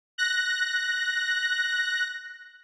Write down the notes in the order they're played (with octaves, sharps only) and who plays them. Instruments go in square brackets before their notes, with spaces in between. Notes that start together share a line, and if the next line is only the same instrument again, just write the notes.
[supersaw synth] F#6 A#6